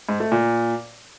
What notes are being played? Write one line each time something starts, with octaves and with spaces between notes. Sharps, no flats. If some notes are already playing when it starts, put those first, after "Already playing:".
G#2
A3
A#2